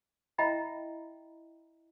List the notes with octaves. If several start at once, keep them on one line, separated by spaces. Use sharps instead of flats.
E4 D#5 E5 G5 A#5 B5